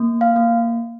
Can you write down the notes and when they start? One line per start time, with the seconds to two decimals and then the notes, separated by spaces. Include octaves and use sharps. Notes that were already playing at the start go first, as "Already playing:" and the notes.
Already playing: A#3
0.21 F5
0.36 A#3